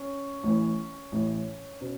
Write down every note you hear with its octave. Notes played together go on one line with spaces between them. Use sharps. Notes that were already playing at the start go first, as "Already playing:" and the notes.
Already playing: C#4
A1 A2 E3
A1 A2 E3
B2 C#4